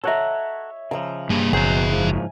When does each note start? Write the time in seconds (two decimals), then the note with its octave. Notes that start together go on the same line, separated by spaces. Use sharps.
0.04 A4 C#5 E5 F#5 A#5
0.91 C#3 F3 A#5 E6
1.30 G2 A#3 G#4
1.53 F#1 B2 F#3 G#4 C5 E5 G#5
1.93 G#2 F3